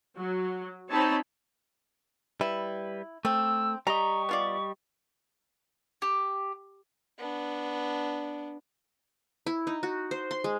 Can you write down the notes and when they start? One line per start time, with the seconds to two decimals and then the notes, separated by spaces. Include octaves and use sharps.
0.17 F#3
0.89 C4 D#4 C#5 A5 B5
2.41 G3 E4 B4
3.25 A3 C4 E6
3.87 G3 G4 D#5 A#5 C#6
4.29 B3 F4 D5
6.02 G4
7.19 B3 D4
9.46 E4
9.67 D#4
9.83 F#4
10.11 C5
10.31 C6
10.44 G#3